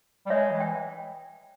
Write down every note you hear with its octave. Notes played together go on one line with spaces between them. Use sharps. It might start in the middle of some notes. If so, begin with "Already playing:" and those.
G3
G#3 C#5 E5
E3
G5